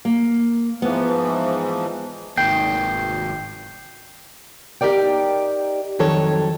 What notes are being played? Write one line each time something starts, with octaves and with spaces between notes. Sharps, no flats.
A#3
G#2 E3 F3 B3
F1 G#2 D#3 A#3 G5 G6 C7
D#4 G4 G#4 A#4 D5 G5
F2 D#3 F#3 A4 C#5